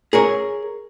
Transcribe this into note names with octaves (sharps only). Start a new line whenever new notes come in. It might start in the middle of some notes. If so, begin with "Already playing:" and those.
G#4 A#4 C#5